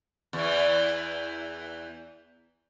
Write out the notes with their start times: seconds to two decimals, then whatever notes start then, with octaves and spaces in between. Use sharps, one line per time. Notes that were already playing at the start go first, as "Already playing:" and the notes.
0.33 E2 E3